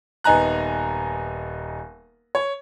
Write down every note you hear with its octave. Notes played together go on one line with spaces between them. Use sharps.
D#1 B3 D#4 G#5 A#5 F#6
C#5